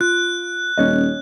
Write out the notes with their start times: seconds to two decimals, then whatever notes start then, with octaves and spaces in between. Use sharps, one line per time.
0.01 F4 F#6
0.78 D#1 C#4 C#5 D#5